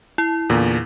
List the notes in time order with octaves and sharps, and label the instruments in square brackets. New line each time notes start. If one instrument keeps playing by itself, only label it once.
[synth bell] E4
[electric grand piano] E2 A#2 D3